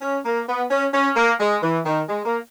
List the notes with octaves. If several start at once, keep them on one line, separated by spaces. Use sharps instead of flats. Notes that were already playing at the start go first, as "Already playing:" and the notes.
C#4
A#3
B3
C#4
C#4
A#3
G#3
E3
D#3
G#3
A#3